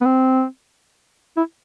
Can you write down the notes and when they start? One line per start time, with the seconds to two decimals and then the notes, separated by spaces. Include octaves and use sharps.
0.01 B3
0.05 C4
1.37 E4